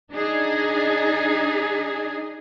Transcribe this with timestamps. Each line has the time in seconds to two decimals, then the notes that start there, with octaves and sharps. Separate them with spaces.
0.12 D4 D#4 G#4